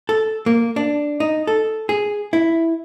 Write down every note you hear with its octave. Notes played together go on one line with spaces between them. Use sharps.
A4
A#3
D4
D#4
A4
G#4
E4